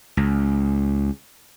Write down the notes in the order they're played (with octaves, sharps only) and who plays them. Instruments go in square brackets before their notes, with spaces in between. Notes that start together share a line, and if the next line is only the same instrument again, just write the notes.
[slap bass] C#2